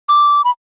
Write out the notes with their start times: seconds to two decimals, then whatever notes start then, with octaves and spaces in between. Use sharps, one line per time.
0.09 D6
0.44 B5